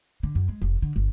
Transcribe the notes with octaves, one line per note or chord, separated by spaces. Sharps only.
D3
F#2
G#3
F1
D3
G1